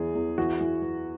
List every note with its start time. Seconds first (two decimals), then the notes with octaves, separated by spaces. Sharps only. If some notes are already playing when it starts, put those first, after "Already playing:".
Already playing: E2 E3 G#4
0.15 E2
0.38 E3 F#4
0.61 E3
0.82 E3